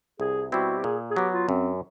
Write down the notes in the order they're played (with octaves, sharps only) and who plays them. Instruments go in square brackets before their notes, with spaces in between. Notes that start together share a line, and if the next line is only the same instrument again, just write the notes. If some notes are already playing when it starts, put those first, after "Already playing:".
[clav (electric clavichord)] C2 [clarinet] G#4
[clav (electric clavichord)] B2 G3 C4 E4 [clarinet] F#4
[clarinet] G4
[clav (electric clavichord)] A#2 [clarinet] G#4
[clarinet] G#4
[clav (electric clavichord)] F#3 B3 [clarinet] G4
[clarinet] F4
[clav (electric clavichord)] F#2 [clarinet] C4